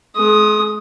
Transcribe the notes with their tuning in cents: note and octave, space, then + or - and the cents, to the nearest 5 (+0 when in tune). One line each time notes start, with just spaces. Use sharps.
G#3 +40 D#6 +0